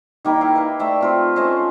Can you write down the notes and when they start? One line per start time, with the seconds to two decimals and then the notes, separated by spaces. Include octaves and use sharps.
0.25 D#3 A#3 G5 B5
0.41 E4 F5
0.55 B4 F5
0.79 A3 D5 E5 G5
1.01 C4 F4 B4
1.36 A3 C#4 C5 D#5